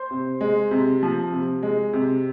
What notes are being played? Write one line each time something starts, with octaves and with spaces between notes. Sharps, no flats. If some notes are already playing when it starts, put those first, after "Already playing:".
Already playing: C5 C6
C3
G#3
C3
F3
C3
G#3
C3